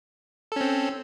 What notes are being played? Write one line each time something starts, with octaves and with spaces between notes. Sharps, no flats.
C4 C#4 A4